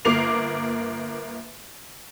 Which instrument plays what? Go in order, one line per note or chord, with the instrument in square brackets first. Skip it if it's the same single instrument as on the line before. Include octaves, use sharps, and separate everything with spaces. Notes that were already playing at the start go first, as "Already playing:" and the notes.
[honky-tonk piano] G1 A#3 D6 C7 F7